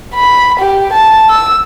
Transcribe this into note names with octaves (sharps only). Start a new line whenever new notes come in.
B5
G4
A5
E6